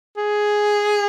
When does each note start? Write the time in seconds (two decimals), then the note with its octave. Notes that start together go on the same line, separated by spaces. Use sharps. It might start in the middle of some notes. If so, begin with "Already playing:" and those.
0.17 G#4